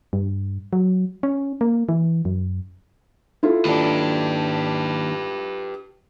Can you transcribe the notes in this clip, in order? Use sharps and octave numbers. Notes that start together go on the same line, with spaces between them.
G2
F#3
C#4
A#3
E3
F#2
E4 F4 A4
D#2 D4 G4 B4